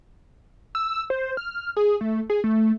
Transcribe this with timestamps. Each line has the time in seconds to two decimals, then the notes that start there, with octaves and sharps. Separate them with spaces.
0.75 E6
1.10 C5
1.37 F6
1.76 G#4
2.01 A3
2.30 G#4
2.44 A3